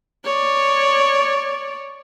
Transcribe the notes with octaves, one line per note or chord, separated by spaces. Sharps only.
C#5 D5